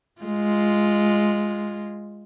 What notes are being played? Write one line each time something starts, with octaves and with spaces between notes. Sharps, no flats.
G#3 F4